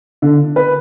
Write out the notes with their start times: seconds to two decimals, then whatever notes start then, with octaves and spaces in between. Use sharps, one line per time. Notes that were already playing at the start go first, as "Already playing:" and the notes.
0.22 D3
0.56 B4